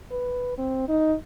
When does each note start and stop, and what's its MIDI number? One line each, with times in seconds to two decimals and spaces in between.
0.11 0.54 71
0.58 0.88 60
0.89 1.14 63